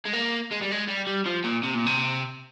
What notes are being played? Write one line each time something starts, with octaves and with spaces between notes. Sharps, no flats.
G#3
A#3
G#3
G3
G#3
G3
G3
F3
A#2
C3
A#2
C3